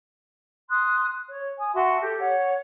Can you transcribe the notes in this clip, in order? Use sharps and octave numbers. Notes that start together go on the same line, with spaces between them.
C6 D#6 F#6
C#5
G#5 D#6
F#4 E5 A5 C6
G4 A4
C#5 F#5